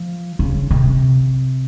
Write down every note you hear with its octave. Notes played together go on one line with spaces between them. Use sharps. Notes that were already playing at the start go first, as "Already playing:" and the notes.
Already playing: F3
C#3
C3